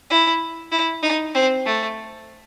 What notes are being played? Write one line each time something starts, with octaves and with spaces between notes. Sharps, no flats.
E4
E4
D#4
C4
A3